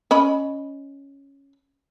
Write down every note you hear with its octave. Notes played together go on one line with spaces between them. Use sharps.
C#4 D#5 B5